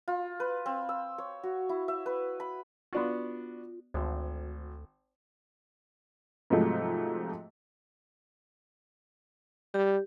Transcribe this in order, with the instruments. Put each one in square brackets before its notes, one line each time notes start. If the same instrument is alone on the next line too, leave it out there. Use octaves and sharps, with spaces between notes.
[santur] F4
B4
C4
E6
C#5
F#4
E4
E5
B4
B5
[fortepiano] B3 D4 F#4 [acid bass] F4
[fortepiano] G#1 [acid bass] D2
[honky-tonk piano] G#2 C3 F3 F#3 G#3 A3
[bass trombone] G3 [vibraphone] G4